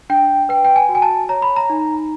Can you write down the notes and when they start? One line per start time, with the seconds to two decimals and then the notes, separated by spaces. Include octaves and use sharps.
0.10 D4 G5
0.49 B4 G5
0.65 G5
0.76 G#5
0.89 F#4
0.95 G#5
1.02 A5
1.29 C#5 A#5
1.42 B5
1.56 A#5
1.70 D#4